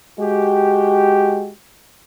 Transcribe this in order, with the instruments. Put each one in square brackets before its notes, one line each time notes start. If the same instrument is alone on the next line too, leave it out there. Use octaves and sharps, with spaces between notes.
[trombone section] G#3 F#4 G4